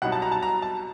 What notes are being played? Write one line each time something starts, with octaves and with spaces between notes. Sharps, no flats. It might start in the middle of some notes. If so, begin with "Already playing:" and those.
C2 B2 F#3 B3 D#4 F#5
A5
A#5
A5
A#5
A5